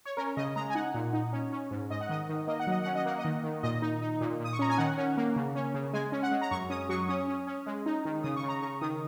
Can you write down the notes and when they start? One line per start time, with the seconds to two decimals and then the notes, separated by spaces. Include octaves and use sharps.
0.05 C#5
0.17 C#4 A#4
0.37 C#3 D#5
0.56 G#3 A#5
0.70 G#5
0.75 D#4 F#5
0.94 A#2
1.13 D#4
1.33 C#4
1.52 C#4
1.71 G#2
1.90 G#2 D#5
2.01 F#5
2.10 D#3 D#5
2.29 D#3
2.48 A#3 D#5
2.60 F#5
2.67 F#3 D#5
2.83 C#4 F#5
2.95 D#5
3.06 A#3 F#5
3.19 D#5
3.25 D#3
3.44 D#3
3.63 A#2 D#5
3.82 D#4
4.02 D#4
4.21 A#2
4.40 A#2 D#6
4.53 C#6
4.59 C#4 A#5
4.70 G#5
4.78 D#3 F#5
4.98 C#4
5.17 A#3
5.36 C#3
5.55 C#4
5.74 C#3
5.93 G#3 G#5
6.12 C#4
6.23 F#5
6.32 G#3
6.41 A#5
6.51 F#2 C#6
6.70 C#4 D#6
6.89 F#3 C#6
7.08 C#4 D#6
7.28 C#4
7.47 C#4
7.66 G#3
7.86 D#4
8.05 D#3
8.23 C#3 D#6
8.36 C#6
8.43 C#3
8.48 A#5
8.60 C#3 C#6
8.81 D#3 D#6